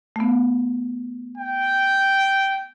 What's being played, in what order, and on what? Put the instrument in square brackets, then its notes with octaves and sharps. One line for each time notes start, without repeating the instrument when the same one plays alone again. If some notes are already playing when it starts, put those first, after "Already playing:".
[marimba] A3 B3
[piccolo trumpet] G5